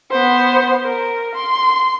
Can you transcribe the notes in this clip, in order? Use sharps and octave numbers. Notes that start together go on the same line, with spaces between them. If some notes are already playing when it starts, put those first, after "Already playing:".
B3 C5
A#4
C6